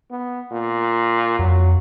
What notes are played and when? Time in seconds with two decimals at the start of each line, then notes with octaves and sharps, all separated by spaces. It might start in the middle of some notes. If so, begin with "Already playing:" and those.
0.11 B3
0.52 A#2
1.39 F2 F#3